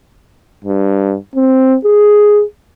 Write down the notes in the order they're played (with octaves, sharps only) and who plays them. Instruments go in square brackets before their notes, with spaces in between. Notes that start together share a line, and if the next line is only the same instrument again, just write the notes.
[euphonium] G2
C4
G#4